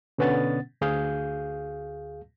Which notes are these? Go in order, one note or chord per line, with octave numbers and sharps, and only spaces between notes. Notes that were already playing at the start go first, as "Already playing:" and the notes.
B2 D3 B3 C#4 F#5 A6
D2 G#4 F5 G6